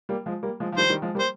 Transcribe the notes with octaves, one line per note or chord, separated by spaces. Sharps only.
G3 A#3
F3 G#3
G3 A#3
F3 G#3
F3
D#3 G3 C5
D#3 G3
F3 G#3
G3 A#3
C5